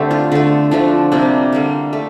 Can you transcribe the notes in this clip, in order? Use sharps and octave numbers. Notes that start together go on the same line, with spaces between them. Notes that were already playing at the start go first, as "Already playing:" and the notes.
Already playing: D3 A3 C4 D4 G4
F4
D3 A3
D3 F3 A3 D4
C3 G3 A#3 D4
D3 G3 A#3
A3